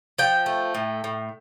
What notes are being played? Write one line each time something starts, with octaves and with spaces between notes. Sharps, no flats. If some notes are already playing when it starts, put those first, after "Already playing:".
F3 G5
A3
A2
A2